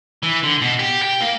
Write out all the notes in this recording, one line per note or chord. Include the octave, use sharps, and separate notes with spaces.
E3
D3
B2
G4
G5
A#3